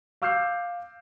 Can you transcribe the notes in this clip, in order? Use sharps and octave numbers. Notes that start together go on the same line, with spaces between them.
F5 D6 E6 F6 G6 C7